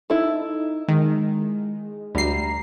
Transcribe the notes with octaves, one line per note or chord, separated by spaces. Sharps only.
D#4 E4 A4
D#3 G#3
D2 G3 A#5 C7